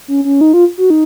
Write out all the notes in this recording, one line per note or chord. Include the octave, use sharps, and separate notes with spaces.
C#4
C#4
D#4
F4
F#4
D#4